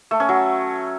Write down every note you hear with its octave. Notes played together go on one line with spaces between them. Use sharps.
A3
C#4
F#3